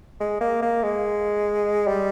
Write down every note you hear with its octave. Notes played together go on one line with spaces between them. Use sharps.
G#3
A#3
A#3
G#3
G3